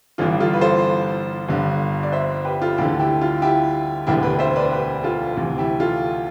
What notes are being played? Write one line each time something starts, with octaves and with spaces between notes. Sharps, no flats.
G1 G2 E3 F4 A4
F4 A4
B4
A4 C5
G1 G2 D3
D5
C5 E5
G4 B4
F4 A4
D2 D3 E4 G4
A4
E4 G4
F4
E4 G4
E1 D2 D3 E4 G4
G4 B4
C5 E5
B4 D5
G4 B4
F4 A4
D2 C3 E3
E4 G4
F4 A4